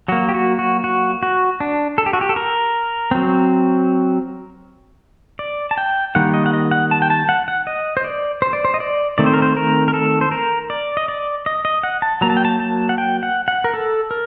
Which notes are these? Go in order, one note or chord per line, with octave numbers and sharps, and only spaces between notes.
F#3 A#3 F#4
G4
F#4
F#4
F#4
F#4
D4
A4
G4
F#4
G4
A4
A#4
F#3 C4
D5
A5
G5
D#3 G3 A#3 F#5
D#5
F#5
D#5
F#5
A5
G5
A5
F#5
F#5
D#5
C5
D5
C5
D5
C5
D#5
D5
D#3 A3 C4 D5
C5
A#4
C5
A#4
A#4
A4
C5
A#4
D5
D#5
D5
D#5
D#5
F#5
A5
F#3 A#3 A#5
A5
G5
A5
A5
F#5
G5
F#5
F#5
A#4
A4
A#4